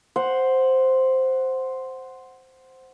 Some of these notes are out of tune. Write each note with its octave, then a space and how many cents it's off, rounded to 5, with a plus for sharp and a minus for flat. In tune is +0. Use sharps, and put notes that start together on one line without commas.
C5 +0 F#5 +0